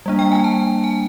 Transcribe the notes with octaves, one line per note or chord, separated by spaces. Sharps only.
G3 A#3 D4
G5
G#5
A5
G#5